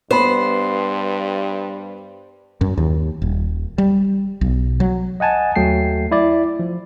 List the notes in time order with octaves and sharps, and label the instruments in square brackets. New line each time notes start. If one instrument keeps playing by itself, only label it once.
[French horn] G2 [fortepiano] B3 B5 [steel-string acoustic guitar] C5
[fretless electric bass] F#2
D#2
D#1
G3
B1
F#3
[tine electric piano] D#5 F#5 G#5 A5
D#2 F#3 A3 G5 C7
E4 D5
F3